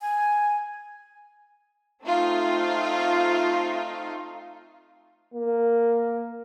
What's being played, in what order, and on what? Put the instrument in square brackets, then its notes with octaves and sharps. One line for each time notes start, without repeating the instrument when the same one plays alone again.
[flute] G#5
[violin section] A3 C4 D#4 F4
[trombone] A#3